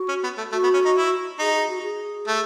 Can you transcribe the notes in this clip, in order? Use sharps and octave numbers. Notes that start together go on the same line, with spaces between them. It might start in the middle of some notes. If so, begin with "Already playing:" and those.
Already playing: F#4
C#4
B3
A3
A3 F#4
B3
C#4
D#4
E4
D#4 G#4
G#4
F#4
G#4
A3